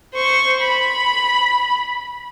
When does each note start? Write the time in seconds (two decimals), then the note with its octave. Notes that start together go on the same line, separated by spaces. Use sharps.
0.14 C5 C#6
0.61 B5